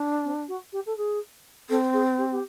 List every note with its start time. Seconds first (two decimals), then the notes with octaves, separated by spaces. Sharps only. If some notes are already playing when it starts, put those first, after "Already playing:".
Already playing: D4
0.24 C4
0.48 F#4
0.72 G4
0.86 A4
0.97 G#4
1.69 C4 A4
1.93 G#4
2.18 G4
2.31 G4